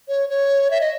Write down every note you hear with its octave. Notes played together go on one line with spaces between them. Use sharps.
C#5
C#5
E5
D#5